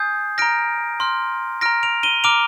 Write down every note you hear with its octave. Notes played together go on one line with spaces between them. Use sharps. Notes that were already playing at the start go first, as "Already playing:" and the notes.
Already playing: G#5 D#6 G6 G#6 C7
A#5 F6 A#6 D7
C6 F6
A#5 F6 A#6 D7
D7 F7
D#7 G7
A#5 D6 F6 D7 F7